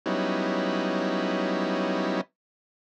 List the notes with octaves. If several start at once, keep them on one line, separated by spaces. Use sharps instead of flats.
F#3 G3 B3 C#4 D#4 E4